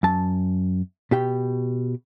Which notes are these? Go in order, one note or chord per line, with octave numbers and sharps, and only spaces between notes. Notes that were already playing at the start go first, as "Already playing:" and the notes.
F#2 A5
B2 G4 G5